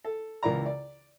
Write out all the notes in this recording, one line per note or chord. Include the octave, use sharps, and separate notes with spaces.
A4
C#2 E3 F4 A#4 D5 A#5
D5